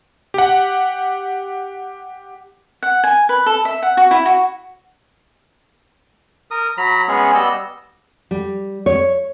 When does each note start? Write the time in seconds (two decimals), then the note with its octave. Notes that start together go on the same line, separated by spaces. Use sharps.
0.34 G4 F#5
2.83 F#5
3.04 G#5
3.29 B4
3.46 A4
3.65 E5
3.82 F#5
3.97 F#4
4.11 E4
4.26 F#4
6.51 A#4 D#6
6.77 F#3 A#5 B5
7.08 G#3 B3 C#4 G#4
7.34 G3 B3 D#5 E6
8.31 G3
8.86 C#5